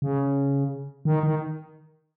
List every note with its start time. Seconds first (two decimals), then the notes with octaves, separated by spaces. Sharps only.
0.02 C#3
1.05 D#3
1.23 D#3